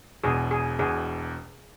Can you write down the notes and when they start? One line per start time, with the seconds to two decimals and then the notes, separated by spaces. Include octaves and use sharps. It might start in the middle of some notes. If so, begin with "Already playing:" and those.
0.24 E1 E2 B2 G#4
0.51 G#4
0.79 E1 E2 B2 G#4